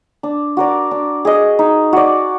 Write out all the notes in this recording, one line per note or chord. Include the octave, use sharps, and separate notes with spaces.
D4
F#4 A#4 D5
D4
G#4 D#5
D#4
F#4 D5